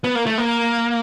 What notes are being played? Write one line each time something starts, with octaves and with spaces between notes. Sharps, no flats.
B3
A#3
A3
A#3